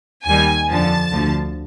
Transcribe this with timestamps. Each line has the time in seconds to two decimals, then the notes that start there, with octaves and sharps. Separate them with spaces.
0.26 D#2 D#3 G3 G#5
0.69 F2 D3 F3 A5
1.12 D2 D3 F3